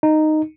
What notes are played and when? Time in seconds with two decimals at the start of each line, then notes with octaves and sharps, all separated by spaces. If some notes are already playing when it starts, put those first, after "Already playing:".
0.03 D#4